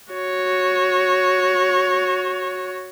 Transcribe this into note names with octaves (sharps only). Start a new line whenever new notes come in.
F#4 C#5